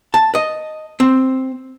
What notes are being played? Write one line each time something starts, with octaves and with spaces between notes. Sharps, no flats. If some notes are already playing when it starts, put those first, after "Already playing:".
A5
D#5
C4